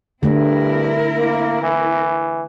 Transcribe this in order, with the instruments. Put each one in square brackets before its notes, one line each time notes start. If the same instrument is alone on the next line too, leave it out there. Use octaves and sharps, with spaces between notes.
[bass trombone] G2 [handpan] D3 A3 [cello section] C4 E4 A#4
[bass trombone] A#3
E3